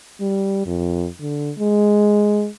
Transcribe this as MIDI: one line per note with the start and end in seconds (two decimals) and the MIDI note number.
0.20 0.65 55
0.66 1.08 41
1.20 1.52 50
1.58 2.48 56